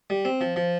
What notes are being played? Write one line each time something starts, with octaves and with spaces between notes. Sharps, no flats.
G3
C4
F3
F3